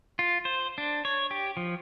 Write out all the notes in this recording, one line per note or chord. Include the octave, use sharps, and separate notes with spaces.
F4
C5
D4
C#5
G4
F3